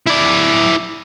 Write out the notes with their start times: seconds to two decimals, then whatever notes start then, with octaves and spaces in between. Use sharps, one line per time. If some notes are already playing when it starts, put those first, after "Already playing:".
0.06 E4 D5